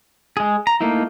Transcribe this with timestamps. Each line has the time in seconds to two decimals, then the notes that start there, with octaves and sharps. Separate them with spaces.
0.37 G#3 G#4
0.67 A#5
0.81 A3 A#3 D#4 E4